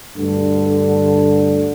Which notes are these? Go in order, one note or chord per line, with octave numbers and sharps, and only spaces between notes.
D2 G2 D3